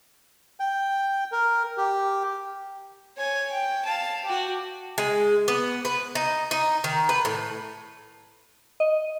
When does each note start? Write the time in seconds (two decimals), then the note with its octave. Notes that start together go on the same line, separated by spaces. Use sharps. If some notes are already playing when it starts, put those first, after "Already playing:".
0.60 G5
1.32 A#4
1.78 G4
3.17 C#5 G#5
3.52 G5
3.85 F5 A5
4.25 F#4 G4
4.98 G#3
5.48 B3
5.85 B4
6.15 D#4
6.51 D#4
6.84 D#3
7.09 B4
7.25 A2
8.80 D#5